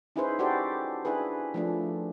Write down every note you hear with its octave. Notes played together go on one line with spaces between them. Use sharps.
C#4 D#4 E4 G#4 B4 C5
F#4 G4 A4 C5 D5
D4 E4 G#4 B4
F3 A3 D4